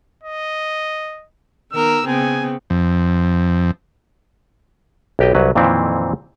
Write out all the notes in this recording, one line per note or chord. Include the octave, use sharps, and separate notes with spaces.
D#5
D#3 B3 A#4 E6
C#3 B3 C4 G#5
F2
B1 G4 D#5
C2 F#3 B4
F2 A#2 D#3 E3 C4 E4